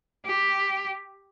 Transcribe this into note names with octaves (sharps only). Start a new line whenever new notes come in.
G4